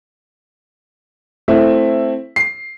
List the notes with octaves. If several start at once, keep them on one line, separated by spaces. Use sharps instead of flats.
A3 C4 E4 E5
C7